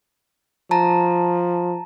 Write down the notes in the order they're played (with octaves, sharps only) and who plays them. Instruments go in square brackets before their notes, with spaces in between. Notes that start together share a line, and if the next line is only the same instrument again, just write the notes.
[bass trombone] F3 [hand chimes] A5 A#5